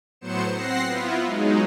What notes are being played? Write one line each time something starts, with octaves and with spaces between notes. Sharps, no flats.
A2 F#3 B3 C5 C#7 E7
C4 F#5 A#6 C7
B3 E4 F4
F#3 G#3 D#4